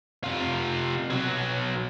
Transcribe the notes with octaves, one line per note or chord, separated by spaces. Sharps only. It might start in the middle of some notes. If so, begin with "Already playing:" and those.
C3 F4
B1 F#3